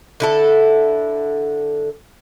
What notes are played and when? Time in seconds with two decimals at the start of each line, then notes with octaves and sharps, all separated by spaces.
0.20 D3 E4 A4